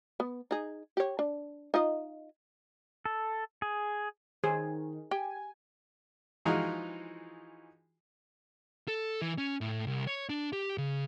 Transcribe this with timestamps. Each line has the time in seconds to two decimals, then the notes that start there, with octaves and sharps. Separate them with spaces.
0.20 B3
0.51 D#4 G#4
0.97 G4 C#5
1.19 D4
1.74 D#4 F4 D#5
3.05 A4
3.62 G#4
4.44 D#3 G#4 C5
5.11 G4 G#5
6.45 E3 F3 G#3 D#4 F4 F#4
8.88 A4
9.22 E3
9.38 C#4
9.61 A2
9.87 C2
10.07 C#5
10.29 D4
10.53 G4
10.78 C#3